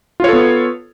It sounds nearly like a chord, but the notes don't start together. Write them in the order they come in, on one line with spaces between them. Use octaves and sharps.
F4 C#5 A4 B3